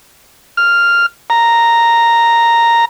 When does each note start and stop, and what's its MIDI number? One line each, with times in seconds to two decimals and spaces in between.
0.57 1.06 89
1.30 2.85 82